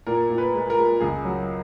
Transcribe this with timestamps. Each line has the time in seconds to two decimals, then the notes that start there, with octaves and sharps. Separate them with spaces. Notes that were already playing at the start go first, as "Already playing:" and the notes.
0.07 A#2 A#4
0.30 A#2
0.38 B4
0.54 G#3
0.70 A#4
0.77 G#3
1.00 C#2 G#4
1.25 F#3